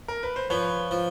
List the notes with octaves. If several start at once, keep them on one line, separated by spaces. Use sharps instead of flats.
A#4
B4
C5
F3 B4 C#5
F3